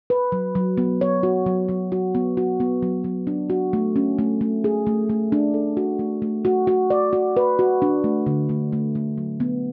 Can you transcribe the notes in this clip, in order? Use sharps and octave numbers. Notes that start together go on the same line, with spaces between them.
B4
F#3
F#3
B3
C#5
F#4
F#3
F#3
F#4
B3
F#4
B3
F#3
F#3
D4
F#4
A3
C#4
A3
A3
G#4
A3
A3
D4
A4
F#4
A3
A3
F#4
F#4
D5
F#4
B4
F#4
D4
A3
D3
A3
A3
A3
F#3
B3